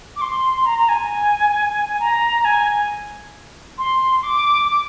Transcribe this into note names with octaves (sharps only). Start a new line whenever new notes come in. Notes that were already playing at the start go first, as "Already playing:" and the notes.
D6
C6
C6
A#5
A#5
G#5
A#5
G#5
C6
D6
D6